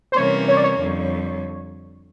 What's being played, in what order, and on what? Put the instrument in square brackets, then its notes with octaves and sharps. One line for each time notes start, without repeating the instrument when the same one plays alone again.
[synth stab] C5
[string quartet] C3 E3 G3 A#3 C#4 [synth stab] C#5
[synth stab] C#5
D5
C#5
[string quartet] F2 D3 G3